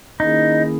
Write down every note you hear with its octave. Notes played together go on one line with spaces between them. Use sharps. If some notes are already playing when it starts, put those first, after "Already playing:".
D#3 A#3 C#4 D#4 E4 G#4